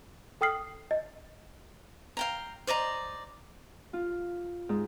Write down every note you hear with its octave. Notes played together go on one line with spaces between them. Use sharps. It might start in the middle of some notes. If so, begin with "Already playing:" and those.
A4 G5 D#6 F6 C7
D#5
F5 G5 A#5
C5 D5 D#5 A#5
F4
G#2